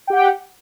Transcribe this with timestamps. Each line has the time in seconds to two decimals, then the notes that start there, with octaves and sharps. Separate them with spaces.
0.07 G5
0.10 G4
0.12 F#5